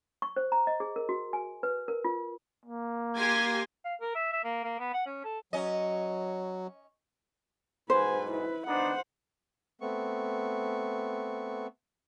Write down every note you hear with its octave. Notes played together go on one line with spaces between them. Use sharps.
C#6
C5
A#5
D#5
G#4
A#4
F#4
G#5
B4
A#4
F4
A#3
G4 G#5 C6 G#6 A#6
F5
A#4
E5
E5
A#3
A#3
B3
F#5
C#4
A4
F#3 C#4 D#5
B1 G#2 B4 C5 G#5
E4 B4
B3 D4 D#4 C5 F#5
A3 B3 C4 C#6